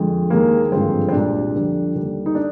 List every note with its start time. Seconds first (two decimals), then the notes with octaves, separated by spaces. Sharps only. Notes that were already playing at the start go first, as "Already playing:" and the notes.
Already playing: F2 D3 G#3
0.30 D#2 D#3 G#3 A#3
0.72 G#1 G2 D3 F3 G#3 C4
1.09 C4
1.12 C2 A#2 G#3 D4
1.54 F2 D3 G3
1.95 D#2 D3 G3
2.26 D#4
2.35 D4